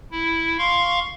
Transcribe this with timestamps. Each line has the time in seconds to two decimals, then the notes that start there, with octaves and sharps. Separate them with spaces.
0.12 E4
0.58 F5 C6 C#6